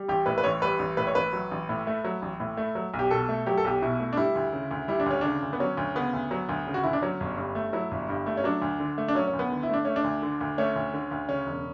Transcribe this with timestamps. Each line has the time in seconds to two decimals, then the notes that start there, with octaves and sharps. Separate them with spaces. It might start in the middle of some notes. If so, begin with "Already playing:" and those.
Already playing: G3
0.09 A1 G4
0.26 A2 B4
0.38 B4
0.44 A1 C#5
0.62 G3 B4
0.79 A1
0.97 A2 B4
1.07 C#5
1.15 A1 B4
1.33 F#3
1.51 A1
1.69 A2
1.87 A3
2.05 F#3
2.22 A1
2.40 A2
2.57 A3
2.75 F#3
2.93 B1
2.99 G4
3.11 B2 A4
3.29 A3
3.46 F#3 G4
3.57 A4
3.64 B1 G4
3.82 B2 E4
4.00 A3
4.13 D4
4.17 G3 E4
4.35 D2
4.53 C#3
4.71 D2
4.88 G3 E4
5.00 D4
5.06 D2 C#4
5.21 C#3 D4
5.42 D2
5.53 B3
5.60 F#3 C#4
5.77 D2
5.95 C#3 B3
6.13 D2
6.31 F#3
6.49 D2
6.67 C#3
6.74 F#4
6.83 D2 E4
6.93 D4
7.02 F#3 C#4
7.20 G1
7.37 G2
7.55 A3
7.73 F#3 E4
7.91 G1
8.09 G2
8.26 A3
8.37 C#4
8.44 F#3 D4
8.62 D2
8.80 D3
8.98 A3
9.08 D4
9.15 F#3 C#4
9.27 C#4
9.33 D2
9.39 B3
9.52 D3
9.63 E4
9.69 A3 D4
9.85 A3 C#4
9.96 D4
10.04 D2
10.22 D3
10.41 D2
10.58 A3 C#4
10.76 D2
10.94 D3
11.11 D2
11.29 C#3 C#4
11.47 E1